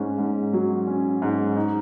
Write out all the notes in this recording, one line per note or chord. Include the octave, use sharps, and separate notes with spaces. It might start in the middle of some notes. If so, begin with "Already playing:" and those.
Already playing: G#2 C#4
G#2
F#3
C#4
G#2
D#4